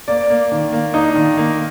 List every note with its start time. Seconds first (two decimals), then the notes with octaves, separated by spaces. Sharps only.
0.08 A#3 D5
0.30 A#3
0.52 D#3
0.72 A#3
0.94 D4 D#4
1.15 D#3
1.37 A#3